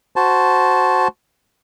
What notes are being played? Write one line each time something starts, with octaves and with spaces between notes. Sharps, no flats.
F#4 C5 A5